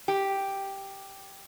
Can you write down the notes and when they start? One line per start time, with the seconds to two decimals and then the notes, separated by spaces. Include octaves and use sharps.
0.08 G4